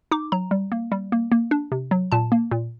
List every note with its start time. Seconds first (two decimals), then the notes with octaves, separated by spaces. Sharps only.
0.11 D#4 D6
0.32 F#3 A#5
0.51 G3
0.72 A#3
0.92 G3
1.12 A#3
1.32 A#3
1.51 D4
1.72 C3
1.91 F#3
2.12 A#2 A5
2.32 A#3
2.51 A#2